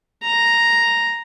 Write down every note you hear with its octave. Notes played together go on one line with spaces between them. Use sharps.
A#5